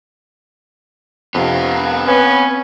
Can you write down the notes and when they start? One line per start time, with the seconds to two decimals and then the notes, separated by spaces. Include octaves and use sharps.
1.35 F2 C3 B3 F5
2.07 C4 C#4 B4